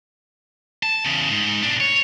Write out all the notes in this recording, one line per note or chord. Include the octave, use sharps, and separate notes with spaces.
A5
E2 C#3
G#2
B2 D4
C#5